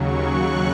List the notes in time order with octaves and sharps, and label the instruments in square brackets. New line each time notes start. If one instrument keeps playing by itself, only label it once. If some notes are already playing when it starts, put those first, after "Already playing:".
Already playing: [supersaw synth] D#2 C#3 F#3 C#6
F#6